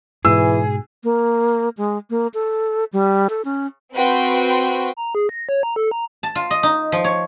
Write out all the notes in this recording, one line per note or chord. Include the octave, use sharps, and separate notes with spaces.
G#2 B2 E3 G#4 E6
A#3
G#3
A#3
A4
G3
A4
C#4
C4 F#4 B4 G5 C6
A#5
G#4
A#6
C#5
A#5
A4
A#5
A5
F4
D#5
D#4
F3
C#5